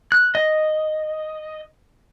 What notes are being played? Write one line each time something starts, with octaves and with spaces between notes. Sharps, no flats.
F#6
D#5